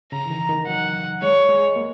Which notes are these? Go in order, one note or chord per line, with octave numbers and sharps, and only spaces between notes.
C#3 A#5
E3
D#3
D#3
F#3 F#5
G#3 C#5
G#3
A#3